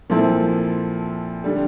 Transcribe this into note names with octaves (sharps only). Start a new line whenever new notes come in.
A#2 F3 C4 E4 A4
D3 G3